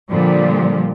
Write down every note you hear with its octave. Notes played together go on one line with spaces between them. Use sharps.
A#2 D3 F3 G3